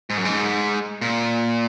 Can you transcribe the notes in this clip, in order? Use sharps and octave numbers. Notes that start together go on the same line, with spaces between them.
G#2
F#2
G#2
A#2